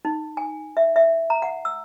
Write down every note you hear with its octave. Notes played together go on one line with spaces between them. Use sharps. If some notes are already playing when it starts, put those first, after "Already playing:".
D#4
G#5
E5
E5
A#5
F#5
E6